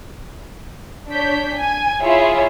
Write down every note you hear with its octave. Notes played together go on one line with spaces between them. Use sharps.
D4 C#5 G6 B6
G#5
E4 F4 G#4 C#5 E5